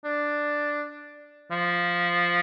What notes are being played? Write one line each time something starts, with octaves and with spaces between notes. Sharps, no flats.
D4
F3